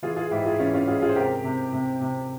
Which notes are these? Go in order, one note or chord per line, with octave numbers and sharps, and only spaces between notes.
E3 F4 G#4
F4 G#4
G#2 E4 G4
F4 G#4
E3 C#4 F4
C#4 F4
G#2 F4 G#4
F4 G#4
C5
C3 G4 A#4
C3
C3
C3